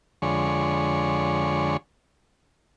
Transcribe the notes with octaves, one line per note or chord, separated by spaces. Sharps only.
F2 D3 G#3 C#5